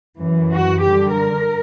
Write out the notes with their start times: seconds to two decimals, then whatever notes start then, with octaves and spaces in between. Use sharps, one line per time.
0.20 F#2 E3
0.51 F#4
0.82 G2 D3 G4
1.12 A#4